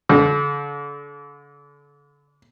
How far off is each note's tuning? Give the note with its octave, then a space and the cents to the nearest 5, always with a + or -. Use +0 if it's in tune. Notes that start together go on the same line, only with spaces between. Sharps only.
D3 -40